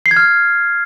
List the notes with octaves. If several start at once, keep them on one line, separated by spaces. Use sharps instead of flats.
C7
G#6
F6